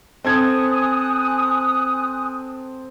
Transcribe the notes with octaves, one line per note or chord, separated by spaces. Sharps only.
C4 A4 G#5 D#6 F#6 G#6